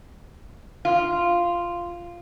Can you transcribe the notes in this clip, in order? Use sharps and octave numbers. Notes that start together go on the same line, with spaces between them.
F4